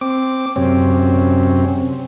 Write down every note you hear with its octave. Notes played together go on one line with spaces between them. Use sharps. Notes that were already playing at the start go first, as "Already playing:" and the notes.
C4 D6
F#2 C3 C4 C#4